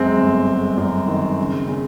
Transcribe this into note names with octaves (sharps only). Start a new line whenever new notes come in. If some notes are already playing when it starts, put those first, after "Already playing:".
Already playing: F#2 G#3 C4
G1
G#3
F#2
D#3
C#3
C#3